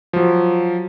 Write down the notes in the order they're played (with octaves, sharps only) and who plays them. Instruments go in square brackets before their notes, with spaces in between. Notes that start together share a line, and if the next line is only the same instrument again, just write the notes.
[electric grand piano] F3 F#3